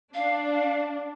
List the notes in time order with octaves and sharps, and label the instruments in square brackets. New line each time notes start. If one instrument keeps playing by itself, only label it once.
[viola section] D4 [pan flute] F5